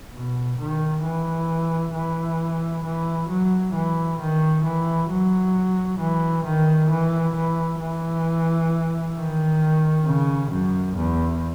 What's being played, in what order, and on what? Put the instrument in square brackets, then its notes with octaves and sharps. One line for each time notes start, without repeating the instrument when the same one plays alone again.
[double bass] B2
D#3
E3
E3
E3
F#3
E3
D#3
E3
F#3
E3
D#3
E3
E3
E3
D#3
C#3
F#2
E2